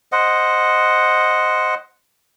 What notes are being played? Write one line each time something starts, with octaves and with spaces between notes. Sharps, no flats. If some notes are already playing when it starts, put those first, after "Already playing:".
C5 D#5 F#5